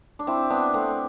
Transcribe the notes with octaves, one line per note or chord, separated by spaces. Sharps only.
D4
C4 E4
B3 D4
A3 C4